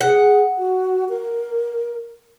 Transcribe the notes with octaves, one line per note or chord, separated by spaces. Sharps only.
G#4 F#5
F#4
A#4